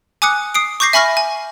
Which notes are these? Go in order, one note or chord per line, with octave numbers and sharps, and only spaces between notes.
G#5 D6 D#6 F#6 C#7
D#6 C7 D7
C#6 D6 G6 A#6 C7
E5 G#5 B5 C#6 F6 A#6
G#5